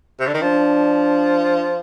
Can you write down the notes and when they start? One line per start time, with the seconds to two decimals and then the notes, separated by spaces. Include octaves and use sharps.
0.20 C3
0.27 D3
0.34 D#3
0.41 F3 D4